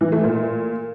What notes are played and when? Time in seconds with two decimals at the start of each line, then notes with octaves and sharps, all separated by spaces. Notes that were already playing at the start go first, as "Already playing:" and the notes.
0.01 E3
0.12 A3
0.24 A#2